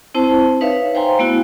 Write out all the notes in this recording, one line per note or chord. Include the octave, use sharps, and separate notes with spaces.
C4 E4 C5 A5
D#4 B4 C#5 E5 F5
C5 F5 G5 G#5 A#5 C6
A3 B3 E4 F#4